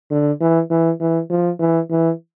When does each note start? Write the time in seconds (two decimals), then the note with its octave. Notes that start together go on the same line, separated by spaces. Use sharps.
0.11 D3
0.41 E3
0.71 E3
1.00 E3
1.30 F3
1.59 E3
1.90 E3